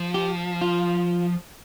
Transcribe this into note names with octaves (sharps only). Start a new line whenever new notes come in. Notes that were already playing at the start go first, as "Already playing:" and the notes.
Already playing: F3
G4
F4